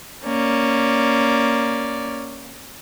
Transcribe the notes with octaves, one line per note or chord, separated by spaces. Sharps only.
A#3 C#4 D5